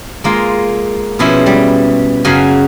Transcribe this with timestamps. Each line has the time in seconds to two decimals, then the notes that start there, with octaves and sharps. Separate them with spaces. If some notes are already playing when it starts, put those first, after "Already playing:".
0.24 G#3 A#3 F4
1.19 B2 F3 G#3 C#4 E4
1.46 G3
2.25 F#2 C#3 F#4 F5 G#5